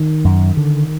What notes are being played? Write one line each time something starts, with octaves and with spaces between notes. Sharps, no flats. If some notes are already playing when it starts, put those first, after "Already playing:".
Already playing: D#3
F#2
D3